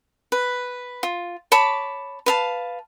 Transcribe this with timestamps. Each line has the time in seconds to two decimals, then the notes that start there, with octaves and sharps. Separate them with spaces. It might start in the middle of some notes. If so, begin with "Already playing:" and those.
0.32 B4
1.03 F4
1.52 C#5 A5 B5 D6
2.26 B4 F5 A5